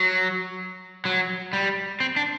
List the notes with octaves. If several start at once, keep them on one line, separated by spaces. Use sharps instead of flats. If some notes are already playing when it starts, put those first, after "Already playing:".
Already playing: F#3
F#3
G3
C4
D4